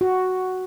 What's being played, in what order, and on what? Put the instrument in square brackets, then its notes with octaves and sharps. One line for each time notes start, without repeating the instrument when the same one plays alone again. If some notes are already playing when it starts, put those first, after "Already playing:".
[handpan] F#4